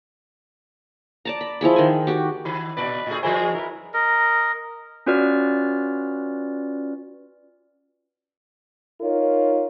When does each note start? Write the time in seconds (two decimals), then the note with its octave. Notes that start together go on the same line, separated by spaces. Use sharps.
1.25 D5 A5 A#5
1.41 B5
1.61 F3 E4 G#4 B5
1.76 D#3 G#5
2.07 F#4 G4
2.45 D#3 B5
2.77 A#2 B4 D5
3.07 A2 A3 G#4
3.23 E3 G#3 E4 A#4 C5 G#5
3.35 G#4
3.54 E4 A#4 B4
3.94 A#4 D#5
5.06 C#4 F4 F#4 B4 D5 F6
9.02 D#4 F4 A#4 C#5